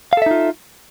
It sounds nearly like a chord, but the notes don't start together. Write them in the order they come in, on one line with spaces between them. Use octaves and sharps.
F5 A4 E5 D#4 F4